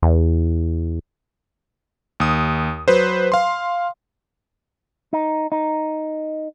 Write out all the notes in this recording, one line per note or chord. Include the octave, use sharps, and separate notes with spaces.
E2
D#2 D#6
F#3 B4 C5
F5 C6
D#4
D#4